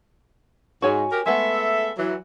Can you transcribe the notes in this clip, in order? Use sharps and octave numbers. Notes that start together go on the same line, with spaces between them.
G#2 F#4 C#5 G#5
G4 A#4
G#3 A3 B3 A4 E5
E3 F#3